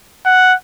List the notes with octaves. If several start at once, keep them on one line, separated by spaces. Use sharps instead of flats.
F#5